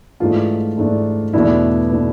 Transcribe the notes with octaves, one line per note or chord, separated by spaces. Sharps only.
G#2 E3 A3 D4 F4
G#2 E3 A3 D4
E2 B2 A3 D4 E4
B2 A3 D4